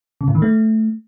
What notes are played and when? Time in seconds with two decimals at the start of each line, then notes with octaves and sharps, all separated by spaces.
0.21 C#3
0.28 A2
0.35 D#3
0.42 A3